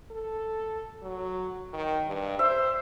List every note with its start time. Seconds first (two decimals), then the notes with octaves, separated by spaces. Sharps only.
0.11 A4
1.02 F#3
1.73 D#3
2.07 G2
2.39 C5 E5